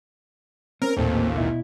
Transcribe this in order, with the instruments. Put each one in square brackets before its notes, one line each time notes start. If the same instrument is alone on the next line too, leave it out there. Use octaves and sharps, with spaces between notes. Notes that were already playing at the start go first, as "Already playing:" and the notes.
[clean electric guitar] C4 C#4 [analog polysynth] A#4
[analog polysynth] A1 D#2 A#2 [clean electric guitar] A#3 C4 A4
[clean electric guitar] B2 E4